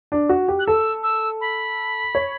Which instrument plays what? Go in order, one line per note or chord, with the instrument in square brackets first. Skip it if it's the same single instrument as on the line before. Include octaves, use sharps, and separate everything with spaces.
[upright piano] D4
F#4
G4
[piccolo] F#6
[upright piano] A4 [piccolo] E6
[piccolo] E6
B5
[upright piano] C#5